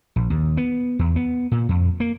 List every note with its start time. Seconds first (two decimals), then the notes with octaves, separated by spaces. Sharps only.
0.16 A#1
0.30 D#2
0.57 B3
0.99 E2
1.16 B3
1.52 A#2
1.69 F2
2.00 A#3